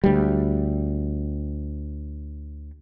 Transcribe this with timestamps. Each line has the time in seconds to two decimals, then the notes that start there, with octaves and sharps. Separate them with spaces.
0.04 D2 G3